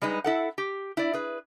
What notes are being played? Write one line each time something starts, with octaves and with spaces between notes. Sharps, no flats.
G3 G#3 D#4 B4
E4 A4 F#5
G4
E4 D5
G#4 B4